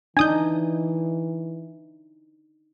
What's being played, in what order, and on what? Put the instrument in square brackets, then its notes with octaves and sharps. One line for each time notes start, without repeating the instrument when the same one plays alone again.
[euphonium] E3 [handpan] D4 D#4 [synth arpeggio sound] G#5 D#6 G6